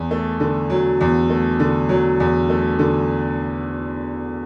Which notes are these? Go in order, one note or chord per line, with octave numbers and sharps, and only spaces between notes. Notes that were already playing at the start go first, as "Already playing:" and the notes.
Already playing: E2
A3
D3
F#3
E2
A3
D3
F#3
E2
A3
D3